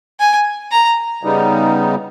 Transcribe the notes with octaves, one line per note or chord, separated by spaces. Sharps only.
G#5
A#5
C#3 G3 B3 D#4